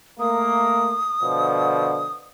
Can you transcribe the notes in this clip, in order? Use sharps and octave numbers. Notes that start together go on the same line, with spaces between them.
A3 A#3 D#6
B2 D3 F3